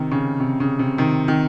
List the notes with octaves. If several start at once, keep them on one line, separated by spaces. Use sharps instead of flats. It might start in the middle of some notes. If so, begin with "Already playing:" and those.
Already playing: C3 D#3
C#3
C3
C#3
C3
C3 D#3
C3 D#3